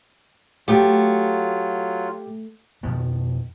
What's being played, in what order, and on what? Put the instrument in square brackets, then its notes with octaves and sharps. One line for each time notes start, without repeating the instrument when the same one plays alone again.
[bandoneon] F#3 F4 [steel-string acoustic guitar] A3 [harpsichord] G4
[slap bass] F2 B2 D#3 F3